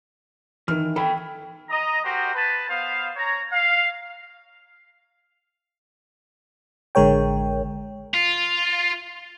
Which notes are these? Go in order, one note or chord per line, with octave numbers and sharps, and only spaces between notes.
D#3 E3 F6
A4 G5 B5
D#5 A#5
F#4 G4 A#4 C5
B4 A5
B3 C5 F5
C#5 A#5
F5
A1 D3 G#3 A#4 C#5 G5
F4